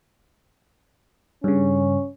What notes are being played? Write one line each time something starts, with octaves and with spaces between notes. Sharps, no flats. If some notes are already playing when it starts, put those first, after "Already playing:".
G2 C#3 C#4